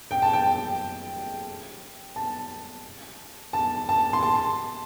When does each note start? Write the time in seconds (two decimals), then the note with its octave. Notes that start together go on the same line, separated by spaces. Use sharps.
0.11 G5
0.22 A5
0.33 G5
2.16 A5
3.53 A5
3.89 A5
4.13 C6
4.23 A5